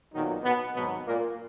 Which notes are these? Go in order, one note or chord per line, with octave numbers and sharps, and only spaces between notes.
B1 A#2 D#3 F#3 D#4
B2 B3
G#1 G#2 B2 F#3 B3
A#2 A#3